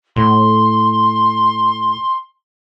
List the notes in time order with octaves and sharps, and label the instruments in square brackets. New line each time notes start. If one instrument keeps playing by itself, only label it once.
[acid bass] A2 [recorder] C6